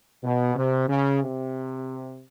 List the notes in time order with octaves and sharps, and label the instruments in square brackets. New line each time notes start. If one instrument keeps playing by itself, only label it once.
[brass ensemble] B2
C3
C#3
C3